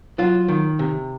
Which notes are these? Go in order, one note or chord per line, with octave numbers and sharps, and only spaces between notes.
F#3 F4
D#3
C3